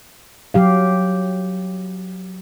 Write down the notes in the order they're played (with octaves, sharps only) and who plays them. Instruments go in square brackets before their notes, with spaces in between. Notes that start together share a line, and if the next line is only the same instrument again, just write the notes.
[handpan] F#3 G4 F5